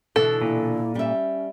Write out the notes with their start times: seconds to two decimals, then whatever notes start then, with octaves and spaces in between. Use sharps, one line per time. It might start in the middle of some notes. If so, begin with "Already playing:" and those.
0.16 B2 D3 E3 A4
0.41 A#2 E4
0.95 G3 C#4 E5